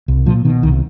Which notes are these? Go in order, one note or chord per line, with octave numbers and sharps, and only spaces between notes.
C2
A#2 F3
B2 D#3
C2 D#3